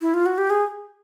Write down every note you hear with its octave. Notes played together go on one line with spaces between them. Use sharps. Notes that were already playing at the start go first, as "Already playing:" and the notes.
E4
F4
F#4
G4
G#4